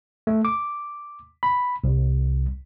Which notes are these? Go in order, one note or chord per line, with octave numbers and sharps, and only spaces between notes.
A3
D6
B5
C2